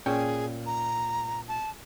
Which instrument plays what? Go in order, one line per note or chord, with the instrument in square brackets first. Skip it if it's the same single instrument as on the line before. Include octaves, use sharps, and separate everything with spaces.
[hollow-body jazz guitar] A#2 C#4 G5 [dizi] G#4
[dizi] A#5
A5